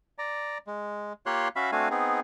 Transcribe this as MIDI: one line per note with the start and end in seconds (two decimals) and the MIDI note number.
0.18 0.58 74
0.18 0.58 82
0.67 1.13 56
1.26 1.48 58
1.26 1.48 65
1.26 1.48 67
1.26 1.48 73
1.26 1.48 84
1.26 1.48 90
1.56 1.71 61
1.56 1.71 66
1.56 1.71 76
1.56 1.71 77
1.56 1.71 83
1.72 1.89 57
1.72 1.89 60
1.72 1.89 62
1.72 1.89 66
1.72 1.89 77
1.72 1.89 80
1.90 2.20 59
1.90 2.20 60
1.90 2.20 63
1.90 2.20 68